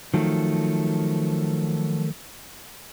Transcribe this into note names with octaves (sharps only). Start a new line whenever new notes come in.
D#3 F3 F#3 A3